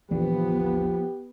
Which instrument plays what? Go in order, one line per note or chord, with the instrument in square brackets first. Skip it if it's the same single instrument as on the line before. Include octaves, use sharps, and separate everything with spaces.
[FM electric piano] A#1 E2 D3 [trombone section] F3 [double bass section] B3 [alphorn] G4